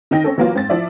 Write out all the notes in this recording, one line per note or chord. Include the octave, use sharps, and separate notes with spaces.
D#3 D#4 G5 A#6
C4 C#4 A4
E3 F#3 A#3 B3 F4
G#2 C4 C5 A6
F3 E4 D5 E5